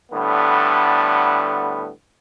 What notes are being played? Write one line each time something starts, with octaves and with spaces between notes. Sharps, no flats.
A2 D3 G3 B3